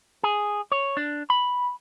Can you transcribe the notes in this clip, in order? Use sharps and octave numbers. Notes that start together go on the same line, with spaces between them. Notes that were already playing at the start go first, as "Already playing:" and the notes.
G#4
C#5
D4
B5